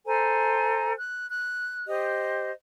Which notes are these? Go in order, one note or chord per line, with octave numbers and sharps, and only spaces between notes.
A4 C5 G#5 A#5
F#6
F#6
G4 C5 D#5